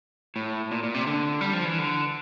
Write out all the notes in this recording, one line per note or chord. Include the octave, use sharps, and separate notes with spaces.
A2
A#2
A#2
C3
D3
G3
F3
E3
D3